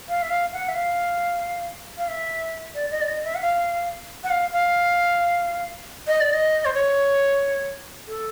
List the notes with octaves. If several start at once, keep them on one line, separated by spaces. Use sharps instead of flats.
F5
E5
F5
F#5
E5
F5
F5
E5
D5
D#5
D5
D#5
E5
F#5
F5
F#5
F5
F5
D#5
D5
D#5
C5
C#5
A4